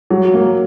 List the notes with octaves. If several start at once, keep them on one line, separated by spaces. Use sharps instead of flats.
F#3
A#3